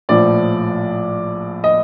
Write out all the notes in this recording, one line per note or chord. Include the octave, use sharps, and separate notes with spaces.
A#1 A2 F3 D5
D#5